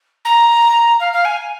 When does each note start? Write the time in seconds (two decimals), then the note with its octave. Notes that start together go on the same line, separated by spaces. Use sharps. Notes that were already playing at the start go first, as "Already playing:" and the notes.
0.25 A#5
1.00 F5
1.13 F5
1.25 G#5